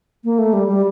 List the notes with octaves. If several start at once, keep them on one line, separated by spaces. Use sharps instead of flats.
A#3
A3
G3
G3